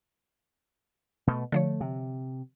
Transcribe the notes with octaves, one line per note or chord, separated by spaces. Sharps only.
B2 A3
D3 F3 A3 C#5
C3